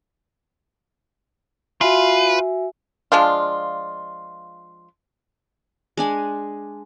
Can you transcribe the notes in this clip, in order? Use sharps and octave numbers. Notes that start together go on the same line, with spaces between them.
F4 F#4 B4 E5 G#5
F3 G#3 D4 F4
G#3 D4 G#5